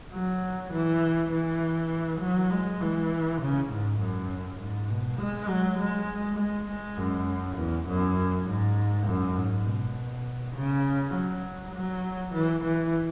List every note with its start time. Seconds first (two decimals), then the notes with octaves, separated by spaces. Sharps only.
0.13 F#3
0.72 E3
1.32 E3
2.21 F#3
2.51 G#3
2.81 E3
3.41 C#3
3.70 G#2
4.00 F#2
4.59 G#2
4.89 B2
5.18 G#3
5.48 F#3
5.78 G#3
6.39 G#3
6.68 G#3
6.97 F#2
7.57 E2
7.88 F#2
8.46 G#2
9.07 F#2
9.36 G#2
9.66 B2
10.56 C#3
11.14 F#3
11.74 F#3
12.34 E3
12.64 E3